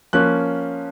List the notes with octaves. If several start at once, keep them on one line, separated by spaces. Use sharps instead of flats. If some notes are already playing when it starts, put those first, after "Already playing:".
F3 A#3 C#4 F#6